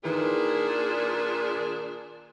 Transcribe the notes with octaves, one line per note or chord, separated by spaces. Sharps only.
A#2 D#3 D4 E4 G#4 B4